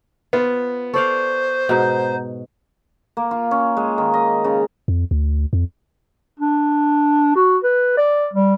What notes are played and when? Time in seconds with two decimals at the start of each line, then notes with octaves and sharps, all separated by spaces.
0.33 B3 F4 C5
0.94 A4 C5 D5 F5 C#6
1.69 G#2 B2 F#5 A#5 G6
3.17 A#3
3.31 F4
3.51 C#4
3.77 G#3
3.98 D#3
4.14 D#5
4.44 C#3
4.88 F2
5.11 D2
5.53 F2
6.39 D4
7.36 F#4
7.63 B4
7.97 D5
8.34 G3